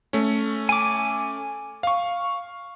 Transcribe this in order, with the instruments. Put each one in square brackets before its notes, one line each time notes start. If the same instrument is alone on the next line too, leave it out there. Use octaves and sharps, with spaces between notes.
[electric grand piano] A3 C#4
[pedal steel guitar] G#5 D6
[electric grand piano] F5 C#6